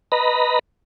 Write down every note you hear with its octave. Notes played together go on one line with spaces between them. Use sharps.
B4 D#5 A#5 B5